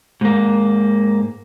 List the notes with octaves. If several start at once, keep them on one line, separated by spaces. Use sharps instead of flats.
G#2 A#3